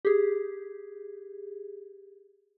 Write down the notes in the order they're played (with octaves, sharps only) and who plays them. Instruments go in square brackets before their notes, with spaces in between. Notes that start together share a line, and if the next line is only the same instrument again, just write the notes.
[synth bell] G4 G#4